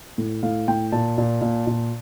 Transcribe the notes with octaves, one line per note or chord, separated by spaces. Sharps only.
A2
A2 F5
A2 G5
A#2 A5
A#2
A#2
A#2